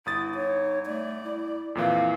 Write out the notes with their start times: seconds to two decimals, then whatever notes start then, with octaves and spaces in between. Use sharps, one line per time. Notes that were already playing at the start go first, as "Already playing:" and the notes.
0.06 G1 E4 D#6 A6
0.35 D#4 C#5
0.86 A3 D5
1.23 E4
1.75 F2 A#2 E3 F5